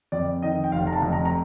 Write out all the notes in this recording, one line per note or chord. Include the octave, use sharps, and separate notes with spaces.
F2 D5
D#3 D#5
G5
F1 F5
A#5
A5
F2
A#5
A#5